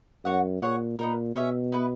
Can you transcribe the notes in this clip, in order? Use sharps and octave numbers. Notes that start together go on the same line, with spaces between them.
F#2 F#4 C#5 F#5
A#2 G#4 C#5 F#5
A#2 B3 D#4 A#4
B2 C#4 G#4 C#5 E5
B3 E4 B4